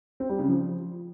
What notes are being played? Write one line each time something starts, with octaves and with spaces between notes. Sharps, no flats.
C4
G3
C#3
F3